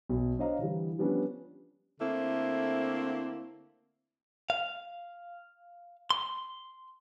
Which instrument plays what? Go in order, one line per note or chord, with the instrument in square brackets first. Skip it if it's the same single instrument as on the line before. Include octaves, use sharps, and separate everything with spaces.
[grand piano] B1
D4 C5 C#5 D#5 F5 A#5
D3 E3 G3
F3 G3 B3 C#4 D4
[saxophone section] D3 A3 A#3 C4 E4
[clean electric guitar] F5
C6